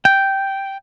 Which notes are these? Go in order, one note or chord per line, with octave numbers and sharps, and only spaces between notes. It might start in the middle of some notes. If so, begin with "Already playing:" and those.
G5